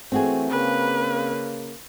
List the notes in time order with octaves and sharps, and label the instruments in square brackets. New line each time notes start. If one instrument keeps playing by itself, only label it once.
[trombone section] E3 A3 [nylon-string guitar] C4 F#4 G#4
[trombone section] C#3 A#3 [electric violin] B4